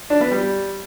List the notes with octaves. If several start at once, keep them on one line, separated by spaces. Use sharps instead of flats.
D4
B3
G3